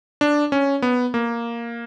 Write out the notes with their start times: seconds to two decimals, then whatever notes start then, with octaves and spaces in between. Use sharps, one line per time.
0.21 D4
0.52 C#4
0.82 B3
1.14 A#3